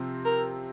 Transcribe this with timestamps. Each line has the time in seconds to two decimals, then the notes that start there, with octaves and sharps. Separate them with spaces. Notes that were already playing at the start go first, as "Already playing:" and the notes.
Already playing: C3 F3 C4
0.25 A#4